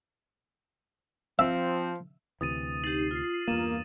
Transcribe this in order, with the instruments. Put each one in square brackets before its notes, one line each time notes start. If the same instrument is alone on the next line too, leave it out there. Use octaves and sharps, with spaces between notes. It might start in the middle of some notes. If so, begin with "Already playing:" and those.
[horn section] F3 C4 [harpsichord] E5
[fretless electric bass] D2 C3 E3 [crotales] D#6 A6 D#7
[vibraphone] D#4 G4 [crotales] A6 F#7 [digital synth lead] C7
[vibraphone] F4
[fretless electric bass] E2 G2 [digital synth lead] A#3 [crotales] D#7 E7 F#7